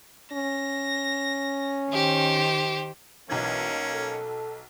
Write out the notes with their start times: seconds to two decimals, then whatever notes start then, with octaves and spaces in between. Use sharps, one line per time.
0.32 C#4 A#6
1.91 D#3 G4 C5
3.30 B1 E3 A#3 C#4 D#4 G#6
3.92 A4